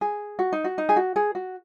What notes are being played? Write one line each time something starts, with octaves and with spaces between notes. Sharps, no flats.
G#4
F#4
D#4
F#4
D#4
G#4
F#4
G#4
F#4